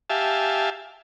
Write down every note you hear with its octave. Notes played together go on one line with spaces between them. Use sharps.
G4 E5 F5 G#5 A5